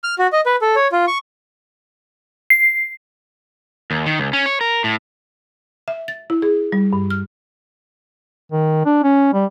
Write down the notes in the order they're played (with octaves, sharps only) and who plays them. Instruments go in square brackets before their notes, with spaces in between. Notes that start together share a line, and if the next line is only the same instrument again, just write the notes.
[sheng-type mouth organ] F6
F#4
D#5
B4
A4
C#5
F4
C#6
[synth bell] C7
[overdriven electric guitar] D#2
D#3
C#2
C#4
C#5
A#4
A2
[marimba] E5
A6
E4
G#4
G3
G2
F6
[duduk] D#3
D4
C#4
G3